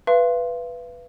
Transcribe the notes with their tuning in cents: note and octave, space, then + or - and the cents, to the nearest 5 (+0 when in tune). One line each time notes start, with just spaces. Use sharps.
B4 +0 F5 -40 C6 +10